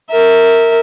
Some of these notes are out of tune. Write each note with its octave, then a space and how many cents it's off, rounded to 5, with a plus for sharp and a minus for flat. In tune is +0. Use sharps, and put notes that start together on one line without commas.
A#4 -15 E5 -20